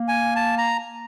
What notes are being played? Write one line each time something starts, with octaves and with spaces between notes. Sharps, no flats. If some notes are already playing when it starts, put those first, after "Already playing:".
Already playing: A#3
G#5
A5
A#5